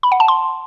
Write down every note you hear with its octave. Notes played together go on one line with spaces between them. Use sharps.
B5
F#5
A5
C6